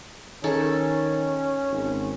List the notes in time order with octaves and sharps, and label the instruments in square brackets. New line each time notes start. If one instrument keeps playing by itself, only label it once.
[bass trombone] D#3 [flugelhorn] C#4 [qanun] D#4 G#4 A4
[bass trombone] G#1